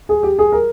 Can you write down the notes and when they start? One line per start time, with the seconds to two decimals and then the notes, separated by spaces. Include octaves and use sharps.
0.09 G#4
0.23 G4
0.39 G#4
0.52 A#4